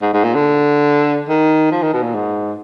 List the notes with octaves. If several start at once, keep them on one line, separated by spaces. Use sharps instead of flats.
G#2
G#2
A#2
D3
D#3
F3
D#3
B2
A#2
G#2